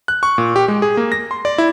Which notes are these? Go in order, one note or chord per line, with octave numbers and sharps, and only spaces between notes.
F#6
C#6
A#2
G4
G#3
G#4
A#3
A#6
C6
D5
E4